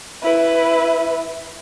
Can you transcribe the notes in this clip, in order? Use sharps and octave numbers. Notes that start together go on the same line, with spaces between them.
E4 B4